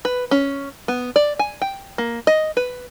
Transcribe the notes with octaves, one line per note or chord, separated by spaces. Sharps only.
B4
C#4
B3
D5
G#5
G5
A#3
D#5
B4